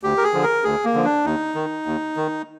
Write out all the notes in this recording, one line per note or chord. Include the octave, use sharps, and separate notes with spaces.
D2 G4
A#4
G#4
D3 F3
A#4
D2 G#4
A#3
D3 F3
D4
D#2 D#4
D#3
D#2
D#3